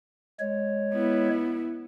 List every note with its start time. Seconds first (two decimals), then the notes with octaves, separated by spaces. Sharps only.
0.40 G#3 C#5
0.93 B3 E4